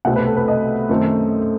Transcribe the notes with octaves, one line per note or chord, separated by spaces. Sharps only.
C2 B2 A3 C4 F#5
B4
A4
B4
D#5
F#2 D#3 A3 C4